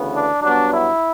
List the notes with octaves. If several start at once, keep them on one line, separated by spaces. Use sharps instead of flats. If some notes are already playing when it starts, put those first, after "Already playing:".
Already playing: D2 C#3 E3 B3
D4
G2 F#3 B3 D4
E4